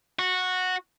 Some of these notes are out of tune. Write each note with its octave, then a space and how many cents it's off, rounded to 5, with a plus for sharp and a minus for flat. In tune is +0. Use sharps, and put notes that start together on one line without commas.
F#4 -10